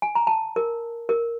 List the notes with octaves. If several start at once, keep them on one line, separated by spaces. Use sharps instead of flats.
G#5
A#5
A5
A#4
A#4